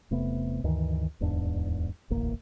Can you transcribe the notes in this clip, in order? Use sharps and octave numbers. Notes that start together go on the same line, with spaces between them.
E1 C3 A3 B3
D2 G2 D#3 E3
D1 E2 G#2 D4
E1 A1 D2 A#3